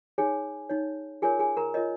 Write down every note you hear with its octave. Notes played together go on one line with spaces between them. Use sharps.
D#4 G#4 C#5 G#5
D#4 C#5
F4 G#4 A#4 C#5 G#5
G#4 G#5
A#4 A#5
F4 A#4 C#5 D#5